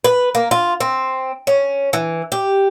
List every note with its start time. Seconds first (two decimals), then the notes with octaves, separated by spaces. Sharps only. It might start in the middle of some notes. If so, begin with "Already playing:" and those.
0.04 B4
0.35 A#3
0.51 F4
0.80 C4
1.47 C#4
1.93 E3
2.32 G4